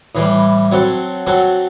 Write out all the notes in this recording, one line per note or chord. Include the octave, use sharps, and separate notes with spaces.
A2 E3 G3
F#3 C4 F#4 A4
F#3 C4 F#4 A4